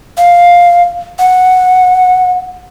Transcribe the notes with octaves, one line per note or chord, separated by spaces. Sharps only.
F5
F#5